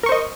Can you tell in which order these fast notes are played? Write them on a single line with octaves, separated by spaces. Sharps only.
A#4 C#6 C5 D#5